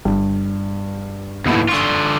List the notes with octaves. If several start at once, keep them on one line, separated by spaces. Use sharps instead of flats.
G1 G2
D#2 A2 B3 E4
D3 F4 C#6 D#6